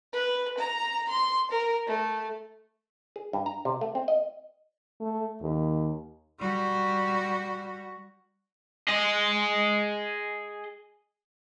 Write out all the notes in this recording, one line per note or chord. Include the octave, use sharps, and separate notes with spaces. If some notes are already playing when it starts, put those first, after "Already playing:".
B4
A#5
C6
A#4
A3
G#4
G2
A#5
C3
A3
C4
D#5
A3
D#2
G3 F#4
G#4 D#5